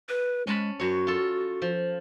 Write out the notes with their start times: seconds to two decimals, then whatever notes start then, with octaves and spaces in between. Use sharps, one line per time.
0.09 B4
0.47 G#3 C#4 A5 B5
0.80 F#2 F#4 C#5
1.07 F4 A4
1.62 F3